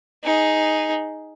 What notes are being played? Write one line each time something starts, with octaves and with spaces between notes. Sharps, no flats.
D#4 G#4